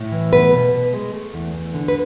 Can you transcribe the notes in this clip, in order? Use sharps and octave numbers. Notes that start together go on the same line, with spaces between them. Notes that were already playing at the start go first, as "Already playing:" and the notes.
Already playing: A2
E3
B3 B4
B2
B2
G#3
A3
E2
E2
D3
B4